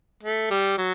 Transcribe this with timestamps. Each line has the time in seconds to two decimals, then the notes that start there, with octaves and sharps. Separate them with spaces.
0.23 A3
0.50 G3
0.78 F#3